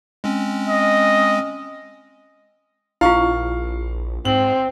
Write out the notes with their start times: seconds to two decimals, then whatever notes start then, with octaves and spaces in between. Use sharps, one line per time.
0.24 G#3 C4 C#4
0.69 D#5
3.01 A#1 E4 F4 F5 C#6
4.25 G#2 C4 F#7